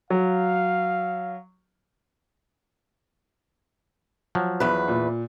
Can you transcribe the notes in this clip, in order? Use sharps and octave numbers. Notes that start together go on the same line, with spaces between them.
F#3 F5
F3 F#3
E2 B4
A#2